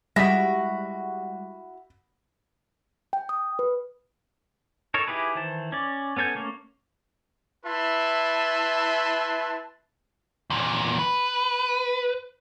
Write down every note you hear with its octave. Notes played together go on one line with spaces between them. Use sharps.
G3 G#3 E4 F#4 A#6 B6
G5
D#6
B4
D#4 A4 A#4 C#5
D#4 E4 G4 G#4 B4
D#3 E3 C5 A5
C#4 D5
B3 C#4 A4 G#5 G6
A3 A#3 C#4
E4 B4 E5 A5 C6
E2 A#2
B4